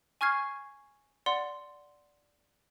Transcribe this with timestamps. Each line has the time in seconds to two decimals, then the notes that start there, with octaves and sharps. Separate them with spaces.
0.21 G#5 C#6 F6 G#6 C7
1.26 D5 F#5 C6